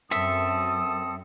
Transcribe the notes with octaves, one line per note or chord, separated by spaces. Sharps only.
F#2 C4 A4 E5 A5 D#6 E6